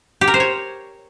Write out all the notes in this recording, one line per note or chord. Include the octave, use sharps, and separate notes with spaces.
G4
A#4
C5
C#5